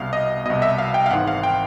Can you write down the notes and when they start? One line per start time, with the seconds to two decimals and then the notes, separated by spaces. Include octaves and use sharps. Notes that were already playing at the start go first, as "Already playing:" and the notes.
Already playing: C2 B2 F5
0.13 D#5
0.46 C2 B2 D#5
0.62 E5
0.78 F5
0.94 G5
1.06 F5
1.10 G#1 G#2 E3 F#5
1.27 F5
1.43 G5